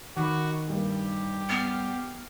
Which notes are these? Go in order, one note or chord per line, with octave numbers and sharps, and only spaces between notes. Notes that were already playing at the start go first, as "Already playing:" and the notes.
D#3 F#4 B5 D6
G2 G3 A#3 G4
B3 F6 C7